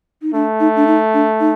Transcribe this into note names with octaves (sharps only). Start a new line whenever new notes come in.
D#4
A3 D4
D#4
D4
D#4
D4
D#4